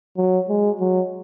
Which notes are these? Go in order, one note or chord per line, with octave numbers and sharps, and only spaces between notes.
F#3
G#3
F#3